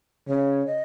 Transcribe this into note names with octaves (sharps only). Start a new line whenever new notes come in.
C#3 C#5
D#5